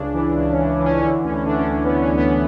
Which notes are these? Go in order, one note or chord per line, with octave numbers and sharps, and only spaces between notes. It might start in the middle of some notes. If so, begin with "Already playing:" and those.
Already playing: C#2 C#3 D4
E3
C#2
C#4
E3
E3
C#4
D3 C#4
D2 C#4
D3 D4
C#4
D2 D4
B3
D3
C#4
D2
B3